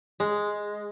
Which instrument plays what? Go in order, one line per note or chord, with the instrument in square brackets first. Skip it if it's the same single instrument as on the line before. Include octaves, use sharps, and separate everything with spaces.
[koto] G#3